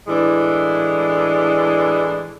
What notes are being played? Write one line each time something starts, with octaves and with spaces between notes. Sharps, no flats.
A2 E3 G#3 D4